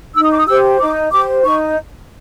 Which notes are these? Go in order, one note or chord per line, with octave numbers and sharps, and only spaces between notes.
D#4 E6
D#6
D6
D#6
G4 C5 E6
D#4 D6
G4 C5 D6
D#4 C#6